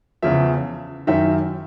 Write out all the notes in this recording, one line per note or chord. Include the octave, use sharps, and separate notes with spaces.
E2 C#3 F3 E5
F#2 D#3 E5